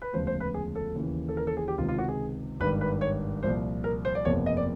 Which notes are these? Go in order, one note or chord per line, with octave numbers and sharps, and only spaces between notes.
B4
E1 D2 C#3 F3 C5
C5
B4
G#4
A4
D#2 C#3 E3
A4
A#4
A4
G#4
G4
C#2 C3 D#3 F4
F4
F#4
G#4
G#1 G2 D#3 B4
B4
C#5
C2 A#2 F3 C5
A#4
C5
D5
F#1 E2 C3 F3 C#5
D#5
D5